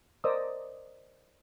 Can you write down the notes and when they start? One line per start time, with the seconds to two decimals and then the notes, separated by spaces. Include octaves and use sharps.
0.24 A#4 C5 D5 D#5 D#6 E6